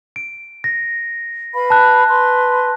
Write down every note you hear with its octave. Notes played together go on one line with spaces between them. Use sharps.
D7
A#6
B4 F5 B5
A5 F#6
B4 C6